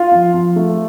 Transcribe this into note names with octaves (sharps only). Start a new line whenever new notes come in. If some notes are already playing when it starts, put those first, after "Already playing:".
Already playing: F4 F5
F3
F3
A3